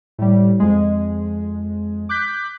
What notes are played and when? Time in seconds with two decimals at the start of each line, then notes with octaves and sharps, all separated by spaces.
0.19 A2 G3
0.60 F2 G#3
2.09 D6 F#6 G6 B6